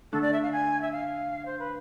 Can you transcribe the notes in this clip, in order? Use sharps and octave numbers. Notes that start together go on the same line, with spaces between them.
D3 A3 D4 A4
D5
E5
F5
G#5
E5
F5
C5
B4